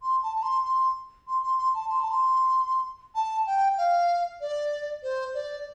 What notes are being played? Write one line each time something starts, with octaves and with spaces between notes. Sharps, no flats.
C6
A5
A5
C6
C6
C6
C6
C6
A5
C6
A5
C6
A5
G5
F5
D5
C5
D5